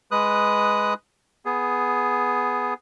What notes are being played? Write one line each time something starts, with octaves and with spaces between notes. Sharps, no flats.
G#3 B4 D#6 F#6
B3 G#4